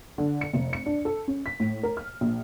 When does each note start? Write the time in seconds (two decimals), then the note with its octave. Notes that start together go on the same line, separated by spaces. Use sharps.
0.18 D3
0.41 C#7
0.53 F1
0.73 C#7
0.86 D4
1.05 A4
1.28 C#4
1.46 B6
1.60 A2
1.83 A#4
1.97 F6
2.21 A#1